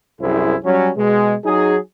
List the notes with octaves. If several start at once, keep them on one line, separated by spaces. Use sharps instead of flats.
C2 F#2 E4 G#4 C5
F#3 G3 C#4
B2 G#3
F#3 D#4 G#4